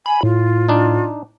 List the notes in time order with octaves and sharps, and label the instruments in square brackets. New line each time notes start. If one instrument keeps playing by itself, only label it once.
[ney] G#5 [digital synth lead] B5
[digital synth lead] A2 [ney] F4
[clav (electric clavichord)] D4 D#4